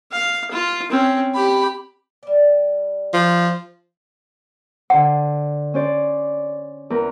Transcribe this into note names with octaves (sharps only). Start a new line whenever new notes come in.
F5
F4
C4 C#4
G4 B5
G3 D5
F3
D3 C5 F#5
C#4 C5 D5
E2 A#4